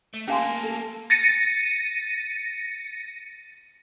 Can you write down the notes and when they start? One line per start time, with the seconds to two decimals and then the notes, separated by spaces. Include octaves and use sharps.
0.14 A3
0.28 A3 A#3 C#4 G4 F5 G#5 A5 C6
0.63 A4
1.10 A6 A#6 C#7 D#7